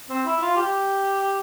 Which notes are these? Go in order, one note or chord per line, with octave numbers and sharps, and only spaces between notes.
C4
E4
F4
G4